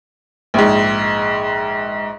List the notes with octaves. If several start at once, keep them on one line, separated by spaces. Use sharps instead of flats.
A#1 G#2